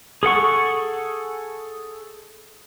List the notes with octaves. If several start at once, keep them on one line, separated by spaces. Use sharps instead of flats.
G#4 A4 F#5 C#6